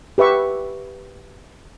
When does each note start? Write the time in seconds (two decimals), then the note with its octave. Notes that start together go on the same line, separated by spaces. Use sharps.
0.18 G4 B4 E5 C#6 E6